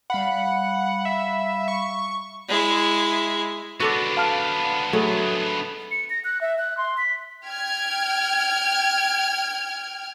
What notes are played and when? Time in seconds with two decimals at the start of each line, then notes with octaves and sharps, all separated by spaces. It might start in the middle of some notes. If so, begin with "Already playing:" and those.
0.10 G3 F5 F#5 B5
1.05 E5
1.68 C#6
2.49 G#3 E4
3.80 B3 D4 F#4 A4 D5
4.17 F5 A5 F6
4.93 F#3 A3 G#4
5.91 C#7
6.10 A#6
6.25 F#6
6.41 E5
6.58 F#6
6.77 C6
6.98 B6
7.48 G5 F6 G#6